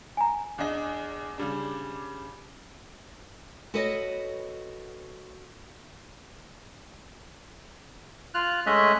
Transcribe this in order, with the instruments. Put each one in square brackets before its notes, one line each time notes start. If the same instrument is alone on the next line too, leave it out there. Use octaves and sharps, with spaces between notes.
[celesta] G#5 A#5
[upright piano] E2 D4 D#5
C#3 G3 D4
[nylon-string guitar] F#4 A4 B4 C#5 D#5
[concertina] F4 F6 F#6
G#3 A3 C#4 D#5 E5 F#6